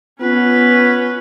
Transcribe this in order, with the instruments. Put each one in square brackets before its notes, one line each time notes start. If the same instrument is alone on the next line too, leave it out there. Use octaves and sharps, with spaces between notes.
[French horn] B3 [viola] C#4 B4 [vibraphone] F4